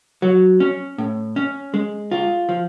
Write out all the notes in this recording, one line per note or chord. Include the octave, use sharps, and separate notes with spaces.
F#3
C#4
A2
C#4
G#3
F4
F3